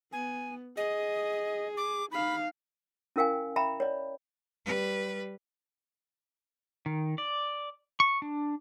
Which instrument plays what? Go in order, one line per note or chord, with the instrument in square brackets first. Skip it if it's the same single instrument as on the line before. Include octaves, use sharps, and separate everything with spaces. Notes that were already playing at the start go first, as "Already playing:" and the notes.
[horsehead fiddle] B3 [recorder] G#5
[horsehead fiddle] G#4 [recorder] D#5
[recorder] D6
[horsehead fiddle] D#4 F5 [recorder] B5
[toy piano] C#4 E4 A#4 F5 G5 G#5
E5 G5 A#5 B5
C#5 D5
[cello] G3 B4
[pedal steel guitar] D#3
D5
C#6
D4